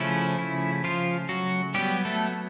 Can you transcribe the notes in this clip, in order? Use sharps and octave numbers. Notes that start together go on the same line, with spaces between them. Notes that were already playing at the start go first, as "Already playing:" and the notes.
Already playing: C#3 F3 A3 C#4 E4
E4
F3 F4
F#3 F#4
F#3 G3 B3 G4
A3 A4